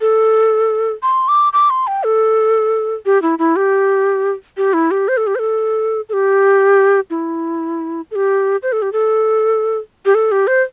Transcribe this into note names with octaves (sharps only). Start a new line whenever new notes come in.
A4
C6
D6
D6
C6
G5
A4
G4
E4
E4
G4
G4
E4
G4
C5
A4
G4
C5
A4
A4
G4
E4
A4
G4
C5
A4
G4
A4
G4
A4
G4
C5